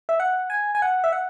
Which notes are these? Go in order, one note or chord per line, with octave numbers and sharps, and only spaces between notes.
E5
F#5
G#5
G#5
F#5
E5
F#5